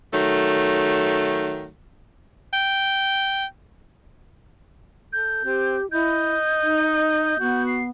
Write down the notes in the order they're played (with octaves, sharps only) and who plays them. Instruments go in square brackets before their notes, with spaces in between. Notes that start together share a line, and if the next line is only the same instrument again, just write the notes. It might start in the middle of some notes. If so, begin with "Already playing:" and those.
[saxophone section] D#3 F#3 A3
[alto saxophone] G5
[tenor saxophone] A4 [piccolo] G6
[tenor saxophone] C4 [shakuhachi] G4
[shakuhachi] E4 [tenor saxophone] D#5 [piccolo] G6
[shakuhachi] D#4
[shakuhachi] B3 [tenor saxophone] F#4
[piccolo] C7